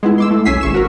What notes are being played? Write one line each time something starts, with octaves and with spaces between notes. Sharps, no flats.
G#3 B3 E4
C6 D6 E6
A3
B1 C#4 G#5 E6 B6 C7
G#1 C#6 E7
F#4 A#4